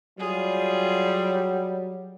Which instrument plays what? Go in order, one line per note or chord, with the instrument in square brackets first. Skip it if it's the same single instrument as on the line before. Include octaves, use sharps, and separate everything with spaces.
[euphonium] F#3 [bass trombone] G3 [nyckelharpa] F4 G#4